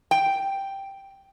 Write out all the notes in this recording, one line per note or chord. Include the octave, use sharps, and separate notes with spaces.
G5